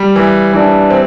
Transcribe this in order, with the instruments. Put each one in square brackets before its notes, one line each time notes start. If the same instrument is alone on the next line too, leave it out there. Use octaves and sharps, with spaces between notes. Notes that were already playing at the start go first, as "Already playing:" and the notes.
Already playing: [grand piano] G3
E3
[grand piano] E3 [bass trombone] D4
[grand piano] C4